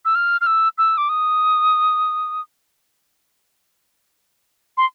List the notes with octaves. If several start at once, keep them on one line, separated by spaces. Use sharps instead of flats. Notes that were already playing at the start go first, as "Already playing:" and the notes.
E6
F6
F6
E6
E6
D6
D#6
C6